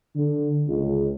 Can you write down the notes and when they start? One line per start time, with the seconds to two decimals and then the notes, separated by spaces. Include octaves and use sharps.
0.16 D3
0.67 C#2